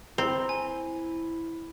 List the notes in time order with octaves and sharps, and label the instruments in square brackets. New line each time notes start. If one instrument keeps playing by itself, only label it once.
[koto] C4 [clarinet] E4 [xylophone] A#5 C6
[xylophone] G#5